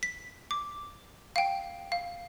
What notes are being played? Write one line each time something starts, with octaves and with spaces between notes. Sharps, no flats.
B6
D6
F5 G5
F5